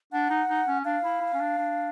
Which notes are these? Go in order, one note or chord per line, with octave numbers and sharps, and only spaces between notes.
D4 F#5
D#4
D#4
C#4
D4 F5
E4
E4
C#4
D4
D4